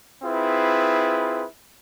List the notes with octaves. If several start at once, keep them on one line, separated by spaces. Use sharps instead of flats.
C4 E4 F4 G#4 B4